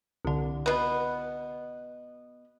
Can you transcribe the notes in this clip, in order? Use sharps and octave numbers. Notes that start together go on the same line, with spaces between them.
C2 D3
B2 B3